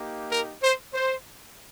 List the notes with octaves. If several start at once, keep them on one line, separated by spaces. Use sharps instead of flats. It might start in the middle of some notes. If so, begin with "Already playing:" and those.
Already playing: A#3 D#4 G4
A#4
C5
C5